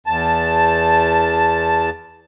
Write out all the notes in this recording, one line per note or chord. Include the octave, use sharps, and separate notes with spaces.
E2 A5